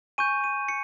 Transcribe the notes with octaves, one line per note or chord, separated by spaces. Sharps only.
G#5 C#6 G6 D#7
D#7
C#7